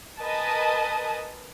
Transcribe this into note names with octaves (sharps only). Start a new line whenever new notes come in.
A#4 B4 D#5 G#5 A5 D#6